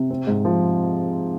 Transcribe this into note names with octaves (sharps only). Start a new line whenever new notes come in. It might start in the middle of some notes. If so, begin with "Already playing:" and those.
Already playing: C3
C4
G#2
F3